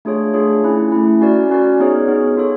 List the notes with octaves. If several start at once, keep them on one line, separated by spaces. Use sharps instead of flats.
A3 D4 F4 G#4 C#5
A3 D4 F4 G#4 C#5
A3 C#4 E4
A3 C#4 E4
C#4 F#4 A#4 D5
C#4 F#4 A#4 D5
B3 D#4 G#4 C#5
B3 D#4 G#4 C#5
F4 A4 C#5